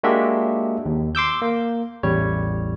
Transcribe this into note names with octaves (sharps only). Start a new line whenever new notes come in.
G#3 A#3 D4 F#4 G4 E5
D#2
C6 D6 E6 G6
A#3
A1 E2 G3 C#5